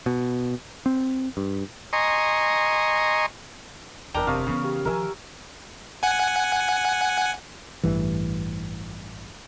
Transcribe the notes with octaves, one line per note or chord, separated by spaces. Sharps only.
B2
C4
G2
D#5 G#5 A#5 C6 C#6 D#6
F#1 E2 D4 A#4 E5 G5 A#5
C3 F5 C#6 D#6
C#3 E3 B3
G4
D#3 F3 A#4 E5 G#5
F#5 G#5
A1 G2 E3